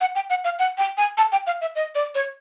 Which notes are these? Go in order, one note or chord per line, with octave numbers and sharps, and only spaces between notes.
F#5
G5
F#5
F5
F#5
G5
G#5
A5
G5
F5
E5
D#5
D5
C#5